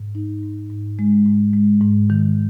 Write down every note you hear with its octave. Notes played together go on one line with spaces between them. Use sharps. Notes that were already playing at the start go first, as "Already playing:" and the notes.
Already playing: G#2
D#4
G#2
G#2
G#3
G#2
G#3
G#2
D#3